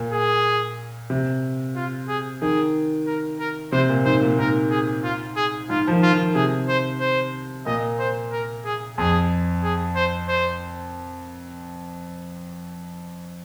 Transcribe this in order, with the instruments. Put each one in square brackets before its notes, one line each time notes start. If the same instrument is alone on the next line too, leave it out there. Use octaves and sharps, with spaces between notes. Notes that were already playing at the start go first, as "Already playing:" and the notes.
Already playing: [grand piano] A#2
[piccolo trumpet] G#4
[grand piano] C3
[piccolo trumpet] F4
G#4
[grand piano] D#3 [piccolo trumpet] G#4
[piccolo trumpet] A#4
A#4
[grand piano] C3 [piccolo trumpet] C5
[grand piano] A#2
[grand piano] G#2 [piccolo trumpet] C5
[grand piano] A#2
[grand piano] G#2 [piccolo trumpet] A#4
[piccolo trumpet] G#4
F4
G#4
[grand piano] G#2 [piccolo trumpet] F4
[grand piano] F3
D#3
[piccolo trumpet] F4
[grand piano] D#3
[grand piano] C3 [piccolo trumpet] G#4
[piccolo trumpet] C5
C5
[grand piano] A#2 [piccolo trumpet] D#5
[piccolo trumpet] C5
A#4
G#4
[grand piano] F2 [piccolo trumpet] G#4
[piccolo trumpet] G#4
C5
C5